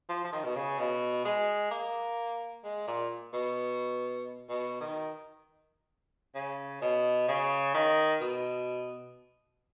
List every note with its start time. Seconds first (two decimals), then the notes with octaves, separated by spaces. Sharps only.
0.09 F3
0.24 F3
0.32 D#3
0.44 B2
0.56 C#3
0.79 B2
1.25 G#3
1.71 A#3
2.64 G#3
2.87 A#2
3.34 B2
4.49 B2
4.81 D#3
6.35 C#3
6.82 B2
7.28 C#3
7.74 D#3
8.21 B2